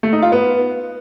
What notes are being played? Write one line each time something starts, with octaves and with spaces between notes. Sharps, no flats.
A3
D#4
F4
B3